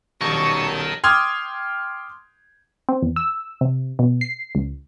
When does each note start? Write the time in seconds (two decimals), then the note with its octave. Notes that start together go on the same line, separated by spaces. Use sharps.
0.21 D#1 B1 D#3 A#4 D#5 A5 C#6
1.04 G5 C6 D6 D#6 F6 G#6
2.89 C4
3.02 E2
3.16 E6
3.61 C3
3.99 B2
4.21 C7
4.55 C#2